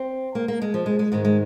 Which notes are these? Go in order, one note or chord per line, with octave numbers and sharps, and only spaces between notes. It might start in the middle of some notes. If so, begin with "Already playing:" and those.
Already playing: C4
A#3
A#3
G#3
F3
G#3
G#3
G#2 D#3 G#3
G#3